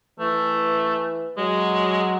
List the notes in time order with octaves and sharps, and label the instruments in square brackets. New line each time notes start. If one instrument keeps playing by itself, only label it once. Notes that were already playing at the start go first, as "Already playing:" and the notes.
[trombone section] E3 [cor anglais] A3
[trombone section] F#3 [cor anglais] G#3